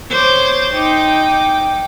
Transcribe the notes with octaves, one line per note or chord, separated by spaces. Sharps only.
C5 C#5 D6
D#4 G5 D6